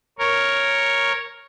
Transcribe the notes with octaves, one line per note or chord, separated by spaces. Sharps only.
A#4 C#5